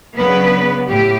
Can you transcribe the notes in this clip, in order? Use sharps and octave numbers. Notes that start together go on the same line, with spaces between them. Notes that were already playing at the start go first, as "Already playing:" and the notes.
C#3 F#3 B3 D4 B4
A2 G4